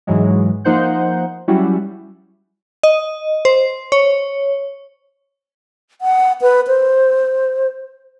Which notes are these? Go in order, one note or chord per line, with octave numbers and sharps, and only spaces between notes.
G#2 E3 F#3 G#3
F3 A#3 D#4 C5 F#5 G6
F#3 G3 C#4 E4 F#4
D#5
C5
C#5
F#5
B4
C5